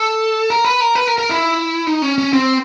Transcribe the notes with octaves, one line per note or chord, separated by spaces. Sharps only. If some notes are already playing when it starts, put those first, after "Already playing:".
Already playing: A4
A#4
B4
A#4
B4
A#4
A#4
E4
D#4
C#4
C#4
C4